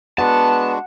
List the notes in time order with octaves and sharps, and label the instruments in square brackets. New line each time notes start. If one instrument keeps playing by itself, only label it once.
[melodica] G#3 D4 F#4 [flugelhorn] B3 [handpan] F#5 [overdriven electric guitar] A5